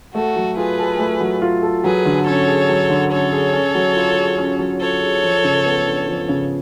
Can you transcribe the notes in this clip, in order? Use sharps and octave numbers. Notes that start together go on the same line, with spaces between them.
A3 F#4 A4
F#3
F4 G#4 B4
A4
A3
F#3
F4
A4
F#3 G#4 B4
D3
C#4 A4 C#5
G#4
F#3
D3
C#4 A4 C#5
G#4
C#4
F#3
F4
G#4
C#4
F#3
F4 A4 C#5
G#4
F3
C#3
B3
D4
F3
C#3